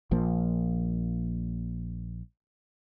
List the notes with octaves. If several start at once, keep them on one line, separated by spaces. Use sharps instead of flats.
A#1 F3 A#3